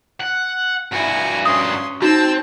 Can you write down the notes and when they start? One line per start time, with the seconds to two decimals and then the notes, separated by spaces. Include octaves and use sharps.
0.20 F#5
0.92 G2 E4 F#4 G#5
1.45 C#4 C6 D#6
2.02 C4 D#4 F#4 A5 E6